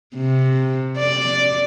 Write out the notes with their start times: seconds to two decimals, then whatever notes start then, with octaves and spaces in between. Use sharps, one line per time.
0.16 C3
0.99 D5